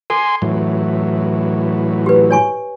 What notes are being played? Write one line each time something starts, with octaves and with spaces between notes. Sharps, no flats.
A4 G#5 C6
A2 E3 F#3
G4 B4
C#5 G#5 C#6